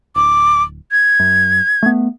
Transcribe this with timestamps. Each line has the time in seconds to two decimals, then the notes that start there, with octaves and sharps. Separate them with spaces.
0.16 D1 D6
0.92 G#6
1.20 F#2
1.83 A3 B3